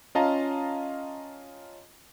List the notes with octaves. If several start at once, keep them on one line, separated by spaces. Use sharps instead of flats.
C#4 F4 D#5 F5 A5 A#5